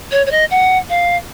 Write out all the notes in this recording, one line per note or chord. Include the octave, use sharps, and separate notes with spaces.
C#5
C#5
D#5
F#5
F5